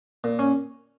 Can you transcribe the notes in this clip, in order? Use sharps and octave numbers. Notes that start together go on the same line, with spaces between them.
A#2
C#4